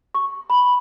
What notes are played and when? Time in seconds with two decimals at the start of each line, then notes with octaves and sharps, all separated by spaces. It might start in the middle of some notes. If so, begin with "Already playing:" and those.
0.15 C#6
0.50 B5